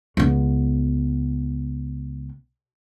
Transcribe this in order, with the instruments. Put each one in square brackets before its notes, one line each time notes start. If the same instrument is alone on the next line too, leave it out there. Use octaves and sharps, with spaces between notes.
[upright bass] C#2 B3